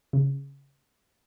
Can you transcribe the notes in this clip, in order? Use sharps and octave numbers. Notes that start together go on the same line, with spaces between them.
C#3